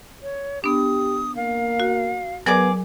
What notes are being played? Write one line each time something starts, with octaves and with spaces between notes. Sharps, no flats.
C#5
B3 D4 G4 D#6
A#3 F5
F#4
F#3 B3 G#4 A#4 D5 D6